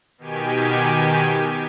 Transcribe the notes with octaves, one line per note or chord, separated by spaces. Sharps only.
B2 D#3 G4 G#5